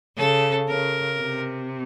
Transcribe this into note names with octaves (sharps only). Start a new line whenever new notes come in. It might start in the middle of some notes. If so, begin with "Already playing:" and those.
C#3 A4
C#3 A#4
C3